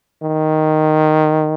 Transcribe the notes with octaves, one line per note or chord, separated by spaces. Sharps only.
D#3